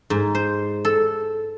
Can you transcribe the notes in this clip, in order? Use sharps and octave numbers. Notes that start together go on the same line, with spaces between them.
G#2
C5
A4